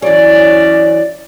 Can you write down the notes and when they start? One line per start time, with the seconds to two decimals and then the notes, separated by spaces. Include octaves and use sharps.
0.02 E3 F#3 C#4 D5